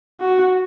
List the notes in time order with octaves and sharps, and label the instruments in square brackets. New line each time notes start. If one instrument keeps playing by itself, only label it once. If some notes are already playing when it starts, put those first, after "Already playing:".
[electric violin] F#4